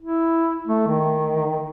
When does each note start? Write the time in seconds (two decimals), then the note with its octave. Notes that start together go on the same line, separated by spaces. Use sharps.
0.01 E4
0.68 A3
0.88 D#3